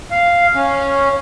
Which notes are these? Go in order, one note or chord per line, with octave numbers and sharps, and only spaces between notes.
F5
C#4